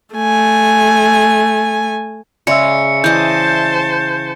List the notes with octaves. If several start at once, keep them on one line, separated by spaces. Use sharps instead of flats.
A3 G#5
C#3 G#3 D5 E5 E6 C#7
E3 C5 D#5 A5 G6